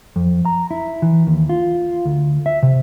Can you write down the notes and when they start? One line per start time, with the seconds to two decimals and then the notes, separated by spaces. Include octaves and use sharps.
0.16 F2
0.45 A#5
0.71 E4
1.02 E3
1.27 D#2
1.49 F4
2.05 D2
2.46 E5
2.63 C3